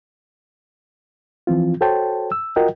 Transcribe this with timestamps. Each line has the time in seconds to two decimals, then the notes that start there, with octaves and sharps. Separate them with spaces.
1.47 E3 F3 C4 F4
1.81 F#4 A4 C5 C#5 G5 A5
2.32 E6
2.56 F4 F#4 A#4 D#5 F#5 G5